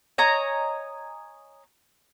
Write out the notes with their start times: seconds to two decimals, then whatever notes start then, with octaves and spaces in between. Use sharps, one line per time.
0.18 C#5 D#5 G#5 A#5